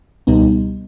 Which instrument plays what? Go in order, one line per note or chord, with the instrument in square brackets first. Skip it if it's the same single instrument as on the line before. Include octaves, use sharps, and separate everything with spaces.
[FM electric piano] C#2 B2 G3 B3 D#4